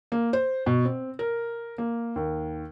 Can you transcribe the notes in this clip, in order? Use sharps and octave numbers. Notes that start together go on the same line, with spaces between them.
A#3
C5
B2
C4
A#4
A#3
D#2